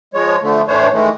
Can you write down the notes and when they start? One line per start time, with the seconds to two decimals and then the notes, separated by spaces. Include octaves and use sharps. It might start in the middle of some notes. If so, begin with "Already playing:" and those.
0.14 F3 G#3 C#5
0.42 D3 F3 A3
0.68 A2 E3 A3 D4 C5 C#5
0.93 D#3 E3 G#3 A3